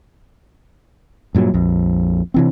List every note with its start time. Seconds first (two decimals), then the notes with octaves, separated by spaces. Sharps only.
1.35 G2 A#2 D3 F#3
1.54 A#1 F2
2.34 C3 E3 C4